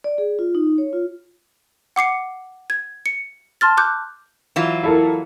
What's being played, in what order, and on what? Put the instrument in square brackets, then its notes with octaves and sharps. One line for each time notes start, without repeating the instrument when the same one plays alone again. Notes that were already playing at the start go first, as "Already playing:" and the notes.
[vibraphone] D5
G#4
F4
D#4
C#5
F4
[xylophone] F#5 D6 C7 C#7
G#6
C#7
A5 C6 F6 A6
D6 F#6 G6
[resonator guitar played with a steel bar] E3 F#3 F4
[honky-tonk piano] E4 A4 A#4